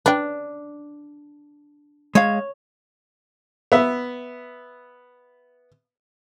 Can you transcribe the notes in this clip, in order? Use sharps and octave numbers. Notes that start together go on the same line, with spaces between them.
D4 B4 G5
G#3 C#5 F5
B3 E5